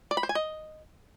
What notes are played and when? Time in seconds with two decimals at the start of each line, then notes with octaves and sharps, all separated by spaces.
0.11 D5
0.17 B5
0.23 C5
0.29 G#5
0.35 D#5